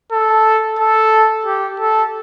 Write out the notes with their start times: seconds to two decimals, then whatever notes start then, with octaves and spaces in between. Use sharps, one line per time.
0.12 A4
0.79 A4
1.46 G4
1.80 A4